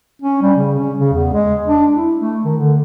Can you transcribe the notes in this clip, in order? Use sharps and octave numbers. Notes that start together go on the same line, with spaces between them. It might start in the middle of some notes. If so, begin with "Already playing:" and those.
C#4
G3
C#3
C#4
C#3
E2
G#3
D4
E4
A3
D#3
D3